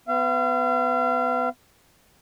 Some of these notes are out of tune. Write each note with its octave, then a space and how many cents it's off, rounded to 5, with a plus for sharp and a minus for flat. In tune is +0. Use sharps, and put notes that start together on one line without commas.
B3 +25 F5 -35